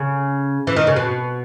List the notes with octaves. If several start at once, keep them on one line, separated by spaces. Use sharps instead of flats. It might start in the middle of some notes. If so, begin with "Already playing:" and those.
Already playing: C#3
E3
D#3
C#3
B2